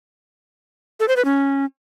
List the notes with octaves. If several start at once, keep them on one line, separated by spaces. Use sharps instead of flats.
A4
C5
B4
C#4